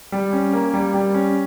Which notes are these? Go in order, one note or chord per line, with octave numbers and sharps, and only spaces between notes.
G3
C#4
A#3
G3
G3
C#4